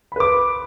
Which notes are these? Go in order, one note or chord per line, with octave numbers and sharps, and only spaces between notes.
B4 B5 D6